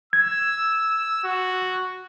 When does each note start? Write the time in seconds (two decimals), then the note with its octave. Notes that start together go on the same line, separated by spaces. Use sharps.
0.13 E6 G#6
1.24 F#4